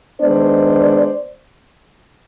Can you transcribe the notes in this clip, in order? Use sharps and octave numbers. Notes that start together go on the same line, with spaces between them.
D#3 G#3 B3 D4 C5 D5